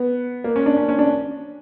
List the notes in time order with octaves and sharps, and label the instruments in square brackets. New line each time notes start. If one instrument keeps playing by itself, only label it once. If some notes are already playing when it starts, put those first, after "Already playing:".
Already playing: [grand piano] B3
A#3
C#4
D4
C#4
C#4
D4